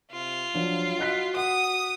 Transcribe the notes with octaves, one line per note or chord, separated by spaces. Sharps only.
C3 F4
F3 F#3 D4
F#4 D#5 F#6 B6
F#5 D#6